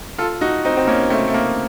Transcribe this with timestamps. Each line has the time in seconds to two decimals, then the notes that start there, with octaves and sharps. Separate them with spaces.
0.18 F4 A4
0.41 D#4 F#4
0.65 C4 D#4
0.77 C4
0.87 A#3 C#4
1.10 A3 C4
1.28 A3
1.34 A#3